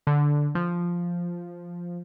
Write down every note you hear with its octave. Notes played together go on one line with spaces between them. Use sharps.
D3
F3